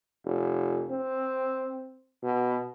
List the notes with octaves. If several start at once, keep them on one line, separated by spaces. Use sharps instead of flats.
F1
C4
B2